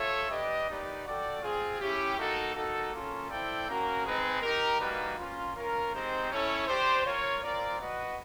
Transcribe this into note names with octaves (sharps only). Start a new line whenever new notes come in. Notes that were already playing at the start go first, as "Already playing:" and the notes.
Already playing: F4 A4 C#5 E5
D4 G4 B4 D#5
A#3 D#4 G4 B4 D5
F#4 A4 D5 G5
C4 F4 G#4
C#4 E4 G4
A#3 D#4 F#4 A4
A#3 D#4 F#4 A4
A#3 C#4 F4 A4 C#5
C4 E4 A4 D5 G5
A#3 C#4 F#4 A#4
G#3 C4 D#4 G#4 B4
D#4 G4 A#4
G3 A#3 D#4 F#4 B4
A#3 C#4 F4
C#4 F4 A#4
G#3 C4 D#4 G4 C5
C#4 E4 A4 C#5
D4 G4 C5
F4 A#4 C#5
C4 F4 A#4 D5
F#4 B4 D#5 F#5